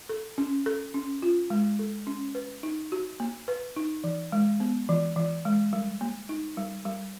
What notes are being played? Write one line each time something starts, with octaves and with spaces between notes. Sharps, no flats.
A4
C#4
A4
C#4
F4
G#3
A4
C#4
B4
D#4
F#4
A#3
B4
D#4
E3
G#3
B3
E3
E3
G#3
G3
A#3
D#4
G3
G3